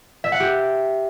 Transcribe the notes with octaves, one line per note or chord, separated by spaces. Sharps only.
E5
F#5
G4